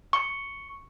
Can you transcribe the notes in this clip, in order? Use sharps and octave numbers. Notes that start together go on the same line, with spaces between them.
C#6